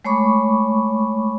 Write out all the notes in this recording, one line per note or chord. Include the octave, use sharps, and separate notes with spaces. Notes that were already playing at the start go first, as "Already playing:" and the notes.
G#3 A3 C#5 B5 C#6 D6